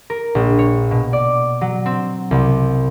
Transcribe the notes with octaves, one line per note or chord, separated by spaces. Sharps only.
A#4
A#1
C#5
B2
D5
F#3
C4
C2